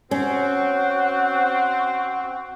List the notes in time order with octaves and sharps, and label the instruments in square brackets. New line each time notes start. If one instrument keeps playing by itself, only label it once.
[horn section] C4 [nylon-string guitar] C#4 [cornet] F#4